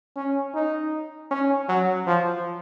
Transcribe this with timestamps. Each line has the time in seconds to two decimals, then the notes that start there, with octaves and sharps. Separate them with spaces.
0.17 C#4
0.54 D#4
1.31 C#4
1.68 F#3
2.06 F3